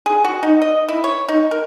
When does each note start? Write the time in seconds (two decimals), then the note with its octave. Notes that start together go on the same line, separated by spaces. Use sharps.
0.06 G#4
0.25 F#4
0.43 D#4
0.62 D#5
0.89 E4
1.04 C#5
1.29 D#4
1.51 A#4